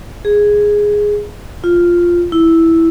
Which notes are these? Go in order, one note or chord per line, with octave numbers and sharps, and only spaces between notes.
G#4
F4
E4